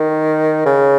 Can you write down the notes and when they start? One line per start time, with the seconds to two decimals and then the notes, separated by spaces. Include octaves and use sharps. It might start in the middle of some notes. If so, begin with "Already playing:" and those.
Already playing: D#3
0.66 C#3